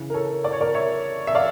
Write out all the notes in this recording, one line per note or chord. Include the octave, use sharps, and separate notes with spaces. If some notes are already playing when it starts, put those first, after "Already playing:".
Already playing: C#3 E3
A#4
A4 C#5
D5
C#5
A#4 D5
C#5 E5
E5
D5 F5